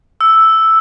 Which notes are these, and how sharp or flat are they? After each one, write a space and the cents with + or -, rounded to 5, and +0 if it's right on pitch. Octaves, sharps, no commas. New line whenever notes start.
E6 +0